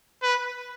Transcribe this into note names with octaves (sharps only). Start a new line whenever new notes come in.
B4